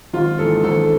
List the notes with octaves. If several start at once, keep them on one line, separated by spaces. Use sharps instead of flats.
G#1 F4
G#2 E3 A4
G#1 A4